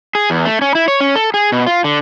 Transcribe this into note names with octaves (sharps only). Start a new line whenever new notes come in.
G#4
E2
A3
C#4
E4
C#5
C#4
A4
G#4
B2
F4
D3